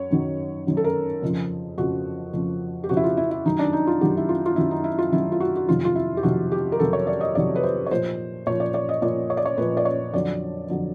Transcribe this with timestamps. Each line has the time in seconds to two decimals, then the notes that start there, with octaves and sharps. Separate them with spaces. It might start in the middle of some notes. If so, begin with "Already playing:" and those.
Already playing: F#2 C#5
0.11 F#2 D#3 F#3
0.67 F#2 D#3 F#3
0.77 A4
0.84 A#4
1.22 F2 C#3 F3
1.78 F2 C#3 F3 F#4
2.33 F2 C#3 F3
2.84 G4
2.89 F2 C#3 F3 F#4
2.97 E4
3.04 F4
3.17 E4
3.31 E4
3.45 F#2 D#3 F#3 D#4
3.59 D4
3.73 D#4
3.87 F4
4.01 F#2 D#3 F#3 G4
4.17 E4
4.29 F4
4.46 F4
4.56 F#2 D#3 F#3 E4
4.71 D#4
4.84 E4
4.98 F4
5.12 F#2 D#3 F#3 E4
5.32 F4
5.40 F#4
5.56 F#4
5.67 F2 C3 D#3 F#3 F4
5.85 F4
5.96 E4
6.17 G4
6.23 F2 C3 D#3 F#3 F#4
6.52 G4
6.72 A#4
6.80 F2 C3 D#3 F#3 A4
6.93 C#5
7.07 D5
7.21 D#5
7.35 F2 C3 D#3 F#3 D5
7.56 B4
7.63 C5
7.86 C#5
7.91 A#2 F3 C5
8.47 A#2 F3 C#5
8.60 D5
8.74 D5
8.89 D#5
9.02 A#2 F3 D5
9.30 C#5
9.37 D5
9.45 C#5
9.57 A#2 F3 B4
9.77 D5
9.85 C#5
10.13 F2 D3 F#3 D5
10.69 F2 D3 F#3